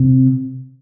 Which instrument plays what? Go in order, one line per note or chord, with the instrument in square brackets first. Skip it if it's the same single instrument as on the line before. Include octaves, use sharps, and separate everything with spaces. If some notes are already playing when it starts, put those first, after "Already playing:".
Already playing: [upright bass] C3